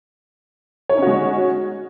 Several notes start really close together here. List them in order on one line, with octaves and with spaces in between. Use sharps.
C#5 D#4 C#4 F#4 G#3